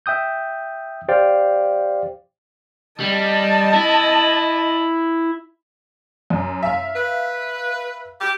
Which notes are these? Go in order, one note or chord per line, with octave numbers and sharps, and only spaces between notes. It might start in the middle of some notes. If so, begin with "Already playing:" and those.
E5 G5 D#6 G6
G4 C5 D5 F5 G5
G3 D#5 A5
E4
F#2
E5 F5
B4
G4